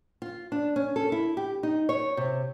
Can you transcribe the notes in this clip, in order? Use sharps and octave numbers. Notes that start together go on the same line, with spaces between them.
F4
D4
C#4
A4
E4
G4
D#4
C#5
C3